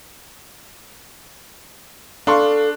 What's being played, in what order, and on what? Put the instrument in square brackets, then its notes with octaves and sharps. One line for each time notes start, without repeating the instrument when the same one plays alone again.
[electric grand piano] D4 [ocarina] A4 [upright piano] F5 C6 C#6